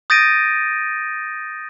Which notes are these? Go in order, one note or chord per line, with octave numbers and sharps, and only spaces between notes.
D#6 G6 A6 A#6 D7 D#7